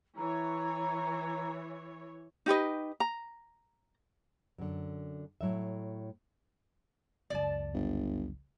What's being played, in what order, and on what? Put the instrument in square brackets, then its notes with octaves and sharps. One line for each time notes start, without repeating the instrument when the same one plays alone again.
[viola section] E3 C#5 [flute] A#5
[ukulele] D#4 G4 B4 D#5
A#5
[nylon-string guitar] F#2 D3
A2 F#3 E5
[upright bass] C#2 F#2 [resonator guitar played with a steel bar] D5 A5
[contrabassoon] G1